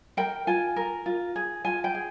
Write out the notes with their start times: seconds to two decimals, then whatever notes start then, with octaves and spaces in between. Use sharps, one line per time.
0.17 A#4 G5
0.47 F4 G#5
0.76 A#4
1.06 F4
1.36 G#4
1.65 F4 G#5
1.84 G5
1.95 G#4